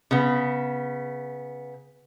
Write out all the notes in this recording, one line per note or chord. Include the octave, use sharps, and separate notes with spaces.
C#3 B3